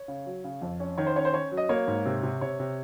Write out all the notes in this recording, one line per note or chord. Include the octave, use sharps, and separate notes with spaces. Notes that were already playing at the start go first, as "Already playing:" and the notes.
Already playing: C#5
C#3
F#3
C#3
F2
C#4
D#3 C#5
C5
C#4 C#5
C5
C#4 C#5
F#3
D#5
A#3 C#5
G#2
C3
C3
C3 C#5
C3